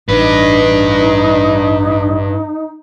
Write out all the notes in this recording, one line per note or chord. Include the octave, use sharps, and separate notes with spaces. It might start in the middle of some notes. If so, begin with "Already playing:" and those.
A1 G2 D4 D#4 B4